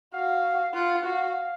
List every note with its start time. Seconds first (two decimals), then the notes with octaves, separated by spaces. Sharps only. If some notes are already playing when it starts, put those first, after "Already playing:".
0.14 F#4 F5
0.74 F4 F#5
1.04 F#4 F5